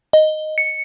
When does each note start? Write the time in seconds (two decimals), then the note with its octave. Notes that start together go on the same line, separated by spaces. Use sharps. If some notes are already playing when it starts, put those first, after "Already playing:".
0.13 D#5
0.58 C#7